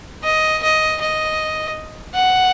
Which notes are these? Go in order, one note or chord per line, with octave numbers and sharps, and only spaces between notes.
D#5
D#5
D#5
F#5